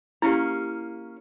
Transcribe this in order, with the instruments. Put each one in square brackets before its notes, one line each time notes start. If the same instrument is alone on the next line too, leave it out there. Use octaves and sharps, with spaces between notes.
[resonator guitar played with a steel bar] A#3 C#4 A#5 [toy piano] E4 G4